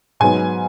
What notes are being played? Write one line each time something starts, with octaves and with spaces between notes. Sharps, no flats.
G#2 F#3 B3 G#5